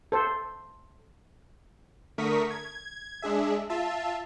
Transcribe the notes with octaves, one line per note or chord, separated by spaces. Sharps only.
A4 C5
D3 A3 A#4 C#6 D#6 B6
G#6
G#3 D4 G#4 E5
F4 E5 A5